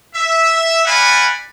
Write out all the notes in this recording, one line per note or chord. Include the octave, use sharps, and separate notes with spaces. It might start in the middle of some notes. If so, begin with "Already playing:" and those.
E5
B4 D5 F5 F#5 G#5 B5